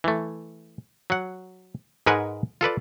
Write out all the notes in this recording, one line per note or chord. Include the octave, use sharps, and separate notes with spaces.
E3 A3
F#3 F#5
G#2 G#3 A#4 B4 F#5 G#5
F4 A4 B4 D5